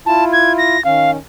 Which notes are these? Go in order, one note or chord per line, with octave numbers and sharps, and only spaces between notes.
E4 F4 A5
G#6
A#6
D#3 C#4 F5